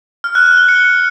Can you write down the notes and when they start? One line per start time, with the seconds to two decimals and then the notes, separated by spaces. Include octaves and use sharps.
0.24 F6
0.35 F#6
0.46 F#6
0.57 G7
0.69 C#7